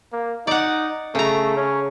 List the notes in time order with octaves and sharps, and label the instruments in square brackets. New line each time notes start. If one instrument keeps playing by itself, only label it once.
[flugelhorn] A#3
[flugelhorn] D#4 [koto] D5 F#5
[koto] C#3 A#5 [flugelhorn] A3
[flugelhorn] C#4